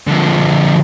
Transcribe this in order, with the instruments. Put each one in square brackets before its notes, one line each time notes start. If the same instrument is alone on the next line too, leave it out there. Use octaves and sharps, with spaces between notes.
[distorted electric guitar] D3 F3